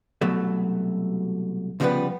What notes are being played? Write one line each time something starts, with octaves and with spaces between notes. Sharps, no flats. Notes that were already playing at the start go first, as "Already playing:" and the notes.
C2 B2 F#3 A3
C2 C#3 F3 G3 B3 B4